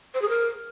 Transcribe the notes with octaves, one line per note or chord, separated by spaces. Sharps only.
C5
G#4
A#4